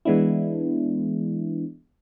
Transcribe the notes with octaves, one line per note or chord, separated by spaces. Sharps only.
E3 G#3 B3 D4 E4